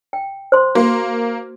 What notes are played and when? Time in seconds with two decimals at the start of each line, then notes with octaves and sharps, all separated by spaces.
0.13 G5
0.52 C5 C6
0.75 A#3 F#4